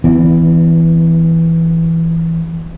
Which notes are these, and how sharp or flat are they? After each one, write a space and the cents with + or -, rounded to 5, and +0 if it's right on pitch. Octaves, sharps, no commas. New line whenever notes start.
E3 +0 B3 +25